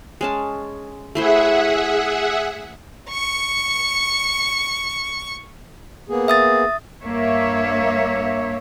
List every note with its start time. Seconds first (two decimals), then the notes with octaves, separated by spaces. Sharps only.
0.21 G#3 C#4 A5
1.15 A3 E4 G#4 C5 E5 F#5
3.10 C#6 C#7
6.09 A#3 B3 G#4
6.28 E5 D#6 A6
7.03 G2 A#3 C#5 E5